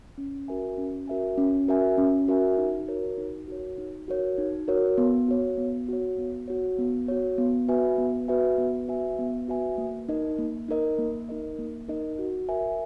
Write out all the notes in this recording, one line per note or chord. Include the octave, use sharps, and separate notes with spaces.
C#4
F#4 A#4 E5 G#5
C#4
F#4 A#4 E5 G#5
C#4
F#4 A#4 E5 G#5
C#4
F#4 A#4 E5 G#5
D#4
F#4 A#4 C#5
D#4
F#4 A#4 C#5
D#4
F#4 A#4 C#5
D#4
F#4 A#4 C#5
B3
F#4 C#5
B3
F#4 C#5
B3
F#4 C#5
B3
F#4 C#5
B3
F#4 B4 E5 G#5
B3
F#4 B4 E5 G#5
B3
F#4 B4 E5 G#5
B3
F#4 B4 E5 G#5
A#3
D#4 A#4 D#5
A#3
D#4 A#4 D#5
A#3
D#4 A#4 D#5
A#3
D#4 A#4 D#5
F#4
A#4 E5 G#5